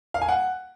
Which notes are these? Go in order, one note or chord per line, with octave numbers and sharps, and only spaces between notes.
F5
G#5
F#5